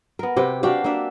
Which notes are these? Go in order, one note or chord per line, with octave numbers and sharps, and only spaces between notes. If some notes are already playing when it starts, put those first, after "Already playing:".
B3 A#4
C3 G4 B4 G5
D4 F#4 G4 F5
A#3 D4 E5